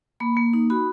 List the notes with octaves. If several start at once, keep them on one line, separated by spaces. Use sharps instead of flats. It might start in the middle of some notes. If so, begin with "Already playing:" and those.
A#3 B5
A#3
D#4
F#4 B5